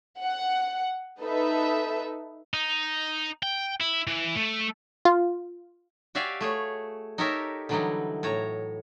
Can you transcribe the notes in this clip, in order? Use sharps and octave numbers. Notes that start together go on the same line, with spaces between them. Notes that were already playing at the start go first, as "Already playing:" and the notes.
F#5
D#4 A4 B4 E5
D#4
G5
E4
E3
A3
F4
F#4 G4 D5 E5 F5 G#5
A3 G#4 C#5
D#4 G4 A4 A#4 C#5 E5
D3 E3 F#3 G3 D#4 E4
A2 C#5 A#5